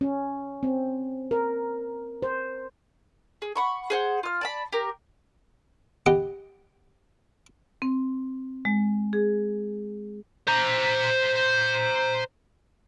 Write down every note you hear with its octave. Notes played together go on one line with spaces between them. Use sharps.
C#4
C4
A#4
C5
G#4
F#5 B5 C#6
G#4 C5 F#5
F4 F6
D5 A5 B5
G4 A#4
B3 G4 D#5 F#5 G5
C4
G#3
G#4
C5 A#5